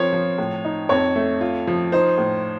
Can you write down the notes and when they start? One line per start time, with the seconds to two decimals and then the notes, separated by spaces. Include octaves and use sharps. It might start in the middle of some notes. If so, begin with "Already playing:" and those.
Already playing: F3 C4 A#4 C5 C#5
0.13 F3
0.38 A2
0.65 D#4
0.89 F2 C#5
1.16 A3
1.41 F4
1.67 F3
1.92 D#4 C5
2.18 A2